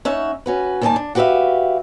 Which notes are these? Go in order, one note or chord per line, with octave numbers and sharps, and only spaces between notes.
C#4 D#4 E5 F#5
C#4 F#4 B4
D#2 D#3 G3 D5 G#5 A5
D4
F#4 G4 B4 D5 E5 F5